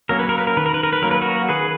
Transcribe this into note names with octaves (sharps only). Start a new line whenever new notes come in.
F#3 A#3 C#4 A#4
B4
A#4
B4
A#4
D#3 B4
A#4
B4
A#4
B4
F#3 A#3 C#4 A#4
B4
F#4 A#4
D#3 G#4 B4